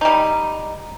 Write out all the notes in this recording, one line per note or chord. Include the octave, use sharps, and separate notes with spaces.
G3 D#4